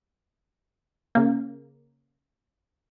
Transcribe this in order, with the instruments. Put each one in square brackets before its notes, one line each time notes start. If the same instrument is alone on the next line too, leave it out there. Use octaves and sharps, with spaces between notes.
[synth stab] C#3 A#3